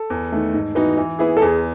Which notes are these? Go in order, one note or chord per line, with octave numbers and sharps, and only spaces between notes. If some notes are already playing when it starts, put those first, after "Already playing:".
Already playing: A4
E2
D#3 A3
G#2
E3 B3 D#4 F#4
E3
B3 E4 G#4
A4
E2 G#4